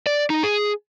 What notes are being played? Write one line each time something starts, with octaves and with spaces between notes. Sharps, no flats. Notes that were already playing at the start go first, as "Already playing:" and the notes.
D5
D#4
G#4